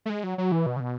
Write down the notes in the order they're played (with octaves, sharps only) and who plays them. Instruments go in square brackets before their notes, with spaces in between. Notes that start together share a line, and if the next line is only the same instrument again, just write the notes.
[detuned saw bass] A3
G#3
F#3
F#3
E3
B2
C#3
B2